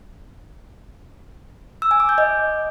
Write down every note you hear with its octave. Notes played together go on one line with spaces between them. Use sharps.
E6
G#5
D6
G6
D#5